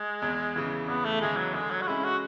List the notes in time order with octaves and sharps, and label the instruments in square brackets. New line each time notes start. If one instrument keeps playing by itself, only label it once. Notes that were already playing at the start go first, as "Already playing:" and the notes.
Already playing: [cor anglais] G#3
[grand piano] E2
C#3 E3
[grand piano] E2 [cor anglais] B3
[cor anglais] A3
[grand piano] C#3 E3 [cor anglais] G#3
[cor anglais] F#3
[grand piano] D3 [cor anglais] G#3
[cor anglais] F#3
F#4
[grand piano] G#3 C#4 [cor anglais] E4
[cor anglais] F#4